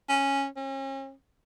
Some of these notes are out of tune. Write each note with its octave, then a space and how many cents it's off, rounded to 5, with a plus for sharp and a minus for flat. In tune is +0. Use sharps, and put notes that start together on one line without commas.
C#4 -10
C#4 -40